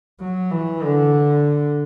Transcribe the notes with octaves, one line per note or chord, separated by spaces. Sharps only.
F#3
E3
D3